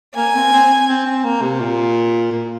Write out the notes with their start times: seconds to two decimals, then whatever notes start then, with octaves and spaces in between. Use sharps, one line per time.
0.16 A#3 G#5
0.35 C4
0.53 C4
0.88 C4
1.06 C4
1.24 A#3
1.42 C3
1.60 A#2
2.32 A#2